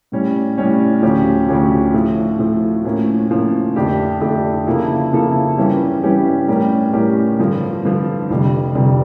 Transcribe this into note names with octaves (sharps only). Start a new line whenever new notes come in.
A2 G3 C#4
A2 G3 C#4
D2 D3 F3 C#4 G4
D2 D3 F3 C#4 G4
A2 F3 A3
A2 F3 A3
A2 F3 A#3 C#4
A2 F3 A#3 C#4
F2 D3 A3 D4 G4
F2 D3 A3 D4 G4
C#3 F3 A#3 E4 A4
C#3 F3 A#3 E4 A4
G2 E3 G3 C#4 G4
G2 E3 G3 C#4 G4
A2 G3 C#4 G4 A#4
A2 G3 C#4 G4 A#4
G2 D3 F3
G2 D3 F3
F1 F2 D3 G3
F1 F2 D3 G3